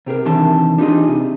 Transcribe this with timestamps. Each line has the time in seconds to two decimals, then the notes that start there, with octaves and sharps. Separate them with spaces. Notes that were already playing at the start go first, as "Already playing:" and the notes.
0.06 C3 G4 G#4 A#4
0.25 C3 D#3 E3 D4 A5 C6
0.78 D4 D#4 F4 G4 G#4 D#5
1.07 C3